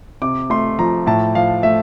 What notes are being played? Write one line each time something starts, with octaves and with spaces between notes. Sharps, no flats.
C3 D6
A3 C6
F3 A#5
A2 A5
F3 F5
A3 E5